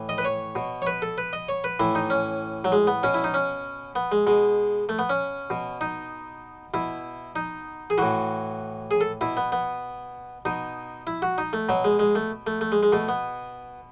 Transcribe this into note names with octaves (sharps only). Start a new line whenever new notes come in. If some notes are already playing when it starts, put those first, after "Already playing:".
Already playing: A2 E3
D#5
B4
C#5
B2
C#5
B4
A4
B4
D#5
C#5
B4
A2 E3 E4
D#4
C#4
F#3
G#3
B3
B2 C#4
E4
D#4
C#4
B3
G#3
B2 G#3
A3
B3
C#4
B2
D#4
B2 E4
D#4
G#4
A2 E3 F#4
G#4
A4
B2 E4
B3
B3
B2 D#4
E4
F#4
D#4
A3
B2 F#3
G#3
G#3
A3
A3
A3
G#3
G#3
B2 A3
B3